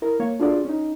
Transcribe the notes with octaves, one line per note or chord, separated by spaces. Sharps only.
E4 A#4
A#3 C#5 C#6
D4 F4 F#4 G#4 A4 D5
C#4 D#4